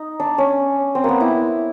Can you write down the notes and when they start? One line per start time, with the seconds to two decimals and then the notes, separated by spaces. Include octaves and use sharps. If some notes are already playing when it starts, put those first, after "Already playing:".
Already playing: D#4
0.20 D4
0.38 C#4
0.95 C4
1.04 A#3 B3
1.21 E4